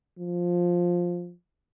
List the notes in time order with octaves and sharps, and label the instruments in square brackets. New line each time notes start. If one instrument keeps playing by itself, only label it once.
[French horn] F3